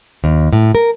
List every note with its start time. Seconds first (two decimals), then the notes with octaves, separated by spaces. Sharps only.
0.24 D#2
0.53 A2
0.75 A#4